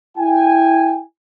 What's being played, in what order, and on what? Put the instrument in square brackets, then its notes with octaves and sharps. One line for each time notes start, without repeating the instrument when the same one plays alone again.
[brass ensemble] E4 G5 G#5